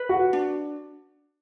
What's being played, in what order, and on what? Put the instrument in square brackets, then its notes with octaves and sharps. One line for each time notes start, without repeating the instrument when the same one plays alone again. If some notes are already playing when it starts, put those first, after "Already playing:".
Already playing: [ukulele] B4
[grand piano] F#4
[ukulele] D4